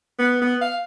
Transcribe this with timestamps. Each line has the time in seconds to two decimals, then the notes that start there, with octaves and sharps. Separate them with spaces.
0.19 B3
0.42 B3
0.61 F5